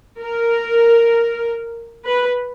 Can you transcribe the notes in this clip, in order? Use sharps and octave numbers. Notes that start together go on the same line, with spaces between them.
A#4
B4